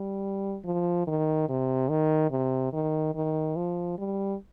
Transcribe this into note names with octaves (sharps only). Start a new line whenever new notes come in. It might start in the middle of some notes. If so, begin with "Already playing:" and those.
Already playing: G3
F3
D#3
C3
D#3
C3
D#3
D#3
F3
G3